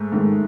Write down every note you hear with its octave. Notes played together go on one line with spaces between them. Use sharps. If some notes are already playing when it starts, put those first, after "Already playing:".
Already playing: G#2 A3
G#2 D#3 A3